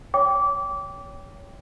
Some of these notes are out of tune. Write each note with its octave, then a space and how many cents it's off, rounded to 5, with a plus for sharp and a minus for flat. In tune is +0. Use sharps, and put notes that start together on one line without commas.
C#5 +25 G5 +0 D6 -20